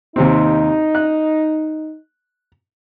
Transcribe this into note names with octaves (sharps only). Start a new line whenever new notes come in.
D#2 C3 C4 D#4
F#6